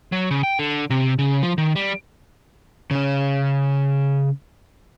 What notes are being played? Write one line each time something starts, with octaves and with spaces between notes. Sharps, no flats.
F#3
C#3
G5
D3
C3
C#3
F3
D#3
G3
C#3 C#4